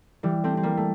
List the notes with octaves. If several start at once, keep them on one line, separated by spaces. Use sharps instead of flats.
E3 G3
A3 C4
C4
G3 A#3
A3